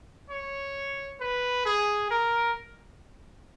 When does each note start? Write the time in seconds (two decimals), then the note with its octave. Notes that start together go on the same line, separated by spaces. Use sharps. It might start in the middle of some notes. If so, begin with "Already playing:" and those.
0.30 C#5
1.20 B4
1.65 G#4
2.11 A#4